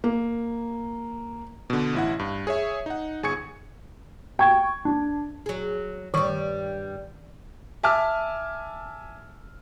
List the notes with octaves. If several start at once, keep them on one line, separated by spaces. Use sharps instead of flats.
A#3
B2 D3
A1 E4 F#5
G2
G#4 C#5 E5
D#4 F#5
G1 G#4 G#5 C#6 G#6 C#7
G5 C#6 G#6
D4
F#3 G#4
G2 D#3 G3 C#6
E5 G#5 A5 D6 E6 F6